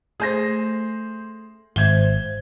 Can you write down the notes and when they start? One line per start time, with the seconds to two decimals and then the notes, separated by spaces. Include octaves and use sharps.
0.20 A3 C#4 G#4 C5 A#6
1.76 G#1 C5 E5 G#6 G7